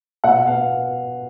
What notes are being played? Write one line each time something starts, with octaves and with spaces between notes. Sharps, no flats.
B2 F#5
B3 F5